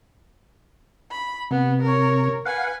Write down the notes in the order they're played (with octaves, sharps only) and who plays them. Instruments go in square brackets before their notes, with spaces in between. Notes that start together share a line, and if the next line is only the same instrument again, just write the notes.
[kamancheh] B5
[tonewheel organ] C3 [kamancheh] B3
[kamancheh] A#4 C#5
[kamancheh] B4 G#5 [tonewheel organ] F5 F#5